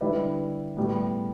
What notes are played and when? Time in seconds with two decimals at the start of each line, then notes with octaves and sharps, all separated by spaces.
0.01 D3 G3 E4 B4 D5
0.77 A2 G3 B3